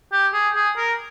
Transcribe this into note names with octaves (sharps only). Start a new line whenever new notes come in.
G4
G#4
G#4
A#4